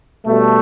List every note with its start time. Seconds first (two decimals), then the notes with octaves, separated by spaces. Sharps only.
0.26 B2 G3 A3